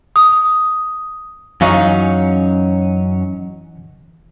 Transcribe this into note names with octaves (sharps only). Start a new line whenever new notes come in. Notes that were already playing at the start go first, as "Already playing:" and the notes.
D#6
F#2 E3 F#3 C#4 D#4 F5 C#6